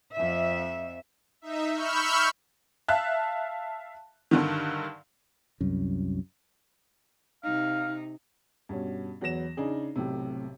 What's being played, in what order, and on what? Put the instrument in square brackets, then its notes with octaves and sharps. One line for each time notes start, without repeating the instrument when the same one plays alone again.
[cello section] F2 E5
[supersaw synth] D#4 E5
B5 C#6 E6 F6 G6
[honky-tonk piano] E5 F5 A5 F#6
G2 D3 D#3
[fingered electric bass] C2 F#2
[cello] C3 D#4 [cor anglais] F5
[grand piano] G2 B2 C#4
E2 F#3 B3 A#6 E7
C#3 D4 D#4 G#4
B1 A2 C3